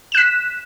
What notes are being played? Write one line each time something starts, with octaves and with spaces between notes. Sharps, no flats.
F#6 B6 E7